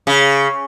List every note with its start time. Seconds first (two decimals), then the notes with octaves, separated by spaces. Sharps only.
0.07 C#3